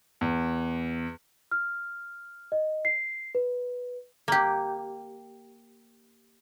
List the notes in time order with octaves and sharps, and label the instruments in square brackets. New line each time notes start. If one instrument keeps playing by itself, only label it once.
[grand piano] E2
[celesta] F6
D#5
C7
B4
[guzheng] A#3 G4